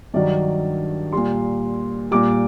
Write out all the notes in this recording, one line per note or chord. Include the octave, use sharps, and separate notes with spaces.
G2 D#3 F#3 D5
A#2 G3 C6
A#2 G3 D6